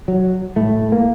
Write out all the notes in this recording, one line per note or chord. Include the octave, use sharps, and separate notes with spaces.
F#3
A2 A3
A#3